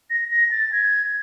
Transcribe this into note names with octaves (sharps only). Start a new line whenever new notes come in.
A#6
A#6
A6
G#6